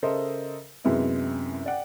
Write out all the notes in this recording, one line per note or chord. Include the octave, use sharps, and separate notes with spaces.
C#3 A4 A#4 C5 D#5 E5
F#2 C3 G#3 B3 E4
D5 F#5 G5